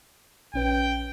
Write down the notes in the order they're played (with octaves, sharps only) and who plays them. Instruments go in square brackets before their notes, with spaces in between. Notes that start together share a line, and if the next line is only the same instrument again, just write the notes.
[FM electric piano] A#1 C#4 B4 [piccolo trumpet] G5